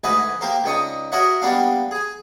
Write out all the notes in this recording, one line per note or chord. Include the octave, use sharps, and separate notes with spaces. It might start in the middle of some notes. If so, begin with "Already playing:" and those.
D2 G#2 B4 D#5 E5 G#5
A#3 G4 A#4 C5
C#2 D4 D#4 C#6 D#6
F#4 A#4 C#5 D#5 E5 F#5
G3 A#3 B3 D4 F5
G#4 G#5